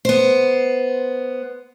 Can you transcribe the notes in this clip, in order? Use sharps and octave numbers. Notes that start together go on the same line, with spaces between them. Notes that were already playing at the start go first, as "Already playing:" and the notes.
B3 C5